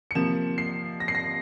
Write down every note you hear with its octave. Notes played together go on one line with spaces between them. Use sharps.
C#7
C3 F3 A#3 E7
C7
A#6
C7
A#6